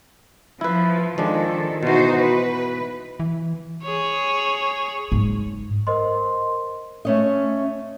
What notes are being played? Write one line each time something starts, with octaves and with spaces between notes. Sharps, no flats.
F3 E4 B4
D#3 F3 G#3 D4 A4
B2 E3 D#4 F#4 C5
B4
E3
G#4 C#5
G#2
A#4 C5 D#5 C6
A3 C#4 D#5